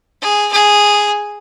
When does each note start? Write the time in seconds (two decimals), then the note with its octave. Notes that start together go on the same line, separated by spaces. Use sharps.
0.22 G#4
0.52 G#4